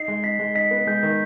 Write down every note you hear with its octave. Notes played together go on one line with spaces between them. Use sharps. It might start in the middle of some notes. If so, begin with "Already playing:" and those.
Already playing: D#4 C7
G#3
D#4 B6
G#3
D#4 B6
B3
G#3 G6
D#3